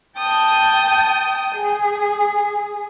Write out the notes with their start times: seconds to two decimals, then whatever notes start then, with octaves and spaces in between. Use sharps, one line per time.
0.16 G5 A5 D#6 G6
1.54 G#4